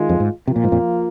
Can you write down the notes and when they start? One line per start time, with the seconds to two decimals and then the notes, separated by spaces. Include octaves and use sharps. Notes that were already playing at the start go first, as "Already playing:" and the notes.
Already playing: D#3 G#3 F4
0.09 F2
0.20 G#2
0.47 C3 F3 A#3 F4
0.56 A#2
0.64 G#2
0.72 F2 A#2